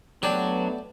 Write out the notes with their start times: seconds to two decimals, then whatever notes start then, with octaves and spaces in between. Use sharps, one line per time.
0.23 F#3 A3 B3 D4 G4 D5